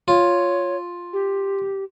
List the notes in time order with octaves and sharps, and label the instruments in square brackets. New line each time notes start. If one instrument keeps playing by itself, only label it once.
[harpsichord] F4 [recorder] C#5
[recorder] G4